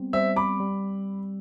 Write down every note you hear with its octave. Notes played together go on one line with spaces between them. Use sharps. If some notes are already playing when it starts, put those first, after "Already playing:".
Already playing: G3 B3 C4
G3 C5 E5
B5 D6
G3